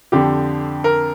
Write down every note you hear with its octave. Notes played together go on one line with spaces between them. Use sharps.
F2 D3 F3 G4
A#4